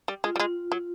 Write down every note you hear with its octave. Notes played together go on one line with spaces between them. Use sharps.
G3
G#3 F4
G3
G#3
F#3